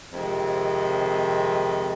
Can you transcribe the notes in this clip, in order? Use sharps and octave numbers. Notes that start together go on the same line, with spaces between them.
F2 C3 D#3 G#3